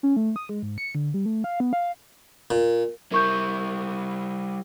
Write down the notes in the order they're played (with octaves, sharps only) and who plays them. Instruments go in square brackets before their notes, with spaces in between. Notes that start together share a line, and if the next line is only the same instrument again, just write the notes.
[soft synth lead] C#4
A3
D#6
G#3
G#2
C#7
D3
G3
A3
F5
B3
F5
[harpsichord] A#2
[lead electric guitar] G3 E4 [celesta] A#4 C#6 G6